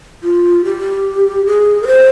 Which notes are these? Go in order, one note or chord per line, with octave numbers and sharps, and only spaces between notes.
F4
G4
G#4
A#4
C5